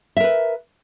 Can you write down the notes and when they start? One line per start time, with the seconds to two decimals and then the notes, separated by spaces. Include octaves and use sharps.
0.17 E5
0.20 A#4
0.24 B4